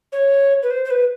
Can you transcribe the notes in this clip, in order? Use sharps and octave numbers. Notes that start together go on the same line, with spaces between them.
C#5
B4
C5
C5
B4